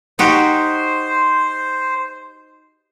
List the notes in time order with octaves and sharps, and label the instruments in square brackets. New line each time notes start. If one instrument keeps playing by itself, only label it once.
[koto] D#4 F#4 G4 [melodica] C5